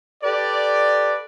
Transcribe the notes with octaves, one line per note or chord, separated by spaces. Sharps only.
G4 A4 B4 D5